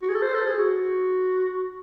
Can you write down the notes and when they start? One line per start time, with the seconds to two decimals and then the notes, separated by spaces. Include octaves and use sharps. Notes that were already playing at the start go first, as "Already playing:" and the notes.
0.02 F#4
0.09 G#4
0.15 A4
0.22 C5
0.34 A4
0.47 G#4
0.59 F#4